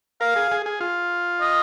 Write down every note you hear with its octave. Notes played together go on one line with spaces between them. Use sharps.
A#4 F5
G#4
G#4
G#4
F4
D#5